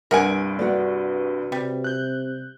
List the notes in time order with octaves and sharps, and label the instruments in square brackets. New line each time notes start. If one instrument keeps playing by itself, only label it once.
[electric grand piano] C2 G2 D7 [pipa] A#4 F#5 G#5
[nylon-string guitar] F#4 B4 D5
[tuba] C3 [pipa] G3
[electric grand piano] F#6 G6